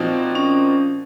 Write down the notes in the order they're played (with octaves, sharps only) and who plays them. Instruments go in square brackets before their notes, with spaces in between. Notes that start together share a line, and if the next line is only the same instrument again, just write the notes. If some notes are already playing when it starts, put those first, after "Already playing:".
Already playing: [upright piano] A#2 F3 C4 D#4 F#4
[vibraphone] C#4